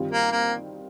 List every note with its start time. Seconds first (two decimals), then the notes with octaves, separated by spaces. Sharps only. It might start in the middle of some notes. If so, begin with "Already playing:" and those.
Already playing: G2 D#3 G3 C4 F4
0.11 A#3
0.32 A#3